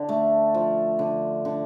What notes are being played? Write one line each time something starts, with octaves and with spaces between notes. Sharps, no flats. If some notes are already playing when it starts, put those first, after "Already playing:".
Already playing: D3
A3
F3
D3
D3